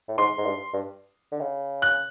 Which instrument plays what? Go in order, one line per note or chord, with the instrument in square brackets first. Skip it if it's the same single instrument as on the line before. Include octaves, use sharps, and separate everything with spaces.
[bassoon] A2
[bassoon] G#2 [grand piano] C6
[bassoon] G#2
G2
G2
D3
C#3
[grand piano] F#6